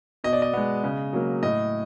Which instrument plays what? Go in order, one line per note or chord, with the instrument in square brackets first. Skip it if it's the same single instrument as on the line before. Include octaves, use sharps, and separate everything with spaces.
[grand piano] B2 D#5
D5
D#5
G#3 B3
C#3
F#3 A#3
A2 D#5